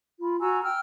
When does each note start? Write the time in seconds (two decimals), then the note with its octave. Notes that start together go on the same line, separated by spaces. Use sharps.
0.21 F4 B5
0.40 F#4 G#5 A#5 E6
0.63 G5 E6 F6